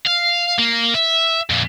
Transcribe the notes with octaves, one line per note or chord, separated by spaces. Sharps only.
F5
A#3
E5
F2 A#2